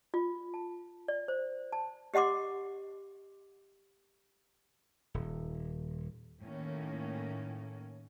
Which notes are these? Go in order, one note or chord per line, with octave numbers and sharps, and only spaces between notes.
F4
A5
D5
C5
A5
G4 D#5 F#5 C6 D6
D#1
A2 D#3 A#3 C#4